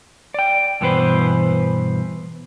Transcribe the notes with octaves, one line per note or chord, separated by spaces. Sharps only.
D5 G5
G2 B2 E3 B3 B4 C5